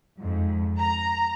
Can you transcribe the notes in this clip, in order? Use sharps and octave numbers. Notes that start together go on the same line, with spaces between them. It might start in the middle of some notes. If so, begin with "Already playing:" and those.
F2 G#2
A#5